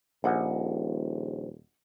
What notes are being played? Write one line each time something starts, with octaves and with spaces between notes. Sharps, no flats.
D#1 A#1 D#5 F#5 G#5